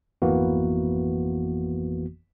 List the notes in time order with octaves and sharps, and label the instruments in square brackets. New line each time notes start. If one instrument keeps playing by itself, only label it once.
[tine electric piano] G#1 F2 E3 A#3 B3 F#4